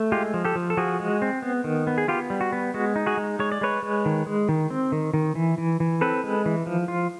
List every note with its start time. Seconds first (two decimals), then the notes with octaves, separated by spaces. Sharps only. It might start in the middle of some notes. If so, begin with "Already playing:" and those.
Already playing: A3
0.12 G#3 F4 G4
0.34 F3
0.45 G4 A4
0.56 F3
0.70 A4
0.77 F3 F#4 G#4
1.00 G#3
1.22 C4
1.42 B3
1.64 D#3
1.87 B3
1.98 G#4
2.08 B3 F4 G4
2.30 G3
2.41 F#4
2.53 B3
2.74 G#3 F#4
2.96 D#4
3.06 F#4 G#4
3.17 G#3
3.39 G#3 C#5
3.52 D5
3.61 G#3 B4 C#5
3.83 G#3
4.06 D#3
4.26 G#3
4.49 D#3
4.70 C4
4.92 D#3
5.14 D#3
5.35 E3
5.58 E3
5.80 E3
6.01 C4 A4 B4
6.24 G#3
6.46 E3
6.66 F3
6.88 F4